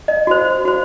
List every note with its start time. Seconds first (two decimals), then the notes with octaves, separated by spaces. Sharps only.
0.08 D#5
0.27 F#4 C5
0.65 F#4 C5